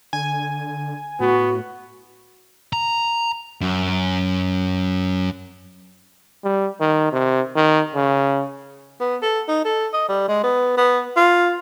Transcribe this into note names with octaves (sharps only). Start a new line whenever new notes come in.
D3 G#5
A2 B3 F#4
A#5
F#2
G3
D#3
C3
D#3
C#3
B3
A4
D#4
A4
D#5
G3
G#3
B3
B3
F4